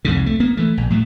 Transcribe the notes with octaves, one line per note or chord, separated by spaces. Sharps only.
C2 F2 G#2 C#3
A3
A#3 B3
E3 A3
A#1
A2 F#3 A3